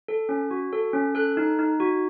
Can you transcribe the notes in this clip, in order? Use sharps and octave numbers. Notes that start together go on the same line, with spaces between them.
A4
C#4
F#4
A4
C#4
A4 F#6
D#4
D#4
F#4